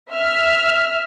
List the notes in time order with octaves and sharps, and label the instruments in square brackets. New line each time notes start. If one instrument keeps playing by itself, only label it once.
[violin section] E5 F6